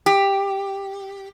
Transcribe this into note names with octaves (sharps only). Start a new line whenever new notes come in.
G4